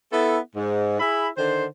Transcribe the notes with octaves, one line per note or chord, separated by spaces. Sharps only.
B3 E4 A4
G#2
E4 G#4 E5 B5
D3 D#3 C5